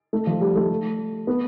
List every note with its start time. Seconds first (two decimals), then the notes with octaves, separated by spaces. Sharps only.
0.13 A3
0.27 F3
0.41 G3
0.56 A3
1.27 B3